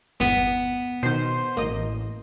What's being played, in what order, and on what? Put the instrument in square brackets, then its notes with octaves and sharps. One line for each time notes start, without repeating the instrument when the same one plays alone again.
[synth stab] G1 E2 B6 [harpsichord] B3
[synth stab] B2 D#3 [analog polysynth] C5
[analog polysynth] A1 [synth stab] A#3 D#5